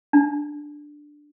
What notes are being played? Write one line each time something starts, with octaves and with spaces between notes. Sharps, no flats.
D4